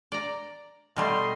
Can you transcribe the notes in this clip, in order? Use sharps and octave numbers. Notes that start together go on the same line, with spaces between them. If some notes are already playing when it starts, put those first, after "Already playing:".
D5 A#5
B2 G3 A3 D#5 C6